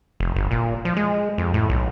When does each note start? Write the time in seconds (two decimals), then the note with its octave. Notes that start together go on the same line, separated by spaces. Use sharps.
0.20 F1
0.36 G1
0.51 A#2
0.85 F3
0.96 G#3
1.38 F2
1.54 A2
1.70 B1